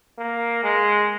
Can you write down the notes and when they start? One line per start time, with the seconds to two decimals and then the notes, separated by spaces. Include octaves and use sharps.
0.18 A#3
0.63 G#3